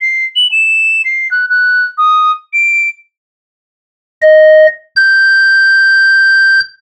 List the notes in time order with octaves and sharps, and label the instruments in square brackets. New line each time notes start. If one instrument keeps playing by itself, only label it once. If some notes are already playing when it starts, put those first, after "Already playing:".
[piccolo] C7
F#7
E7
C7
F#6
F#6
D#6
D7
[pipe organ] D#5
G6